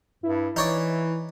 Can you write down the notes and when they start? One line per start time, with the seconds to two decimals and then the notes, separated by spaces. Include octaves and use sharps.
0.23 G2 E4
0.56 E3 D#4 C#5 D5